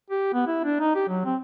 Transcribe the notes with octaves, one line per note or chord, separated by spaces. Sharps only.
G4
B3
E4
D4
D#4
G4
F#3
C4